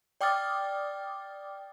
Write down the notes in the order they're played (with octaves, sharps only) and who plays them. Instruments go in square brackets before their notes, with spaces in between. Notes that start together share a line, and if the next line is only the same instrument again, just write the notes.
[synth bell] D5 G5 D6 D#6 F6 A6